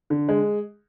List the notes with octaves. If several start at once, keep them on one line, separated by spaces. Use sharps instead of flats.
D3
G#3